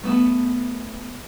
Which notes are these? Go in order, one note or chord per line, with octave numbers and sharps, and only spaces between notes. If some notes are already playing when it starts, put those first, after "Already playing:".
A3 B3 A5